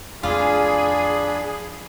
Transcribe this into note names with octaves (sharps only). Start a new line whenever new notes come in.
F2 A2 D4 F4 G#4 B5